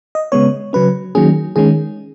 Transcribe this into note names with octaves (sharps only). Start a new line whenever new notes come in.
D#5
C#3 G#3 B3 C#5
C#3 F#3 C#4 B4
D#3 F#3 A#3 C#4 G#4
D#3 G#3 C#4 G#4